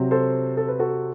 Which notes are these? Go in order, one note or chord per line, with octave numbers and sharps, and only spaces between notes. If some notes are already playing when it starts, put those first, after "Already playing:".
Already playing: C3 F#3 C4
A4 C5
A4
B4
F#4 A4